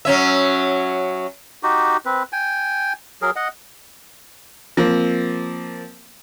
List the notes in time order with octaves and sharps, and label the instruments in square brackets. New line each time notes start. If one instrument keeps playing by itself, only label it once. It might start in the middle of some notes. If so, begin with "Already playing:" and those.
[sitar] F#3 C#4 E5
[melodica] D#4 F#4 G4
C4 B4
G5 G#5
F#3 G#4 A#4
D#5 F#5
[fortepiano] F3 A#3 C4